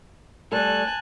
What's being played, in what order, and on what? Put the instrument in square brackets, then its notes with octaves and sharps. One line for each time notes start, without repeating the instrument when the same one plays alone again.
[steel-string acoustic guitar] G3 A3 A4 [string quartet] G#5 A5 F#6